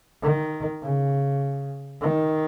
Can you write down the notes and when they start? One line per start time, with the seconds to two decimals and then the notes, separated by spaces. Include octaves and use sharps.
0.23 D#3
0.82 C#3
2.02 D#3